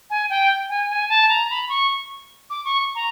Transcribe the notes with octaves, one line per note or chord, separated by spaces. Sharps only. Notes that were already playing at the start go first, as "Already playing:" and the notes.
G#5
G5
G#5
G#5
A5
A#5
B5
C#6
D6
C#6
A#5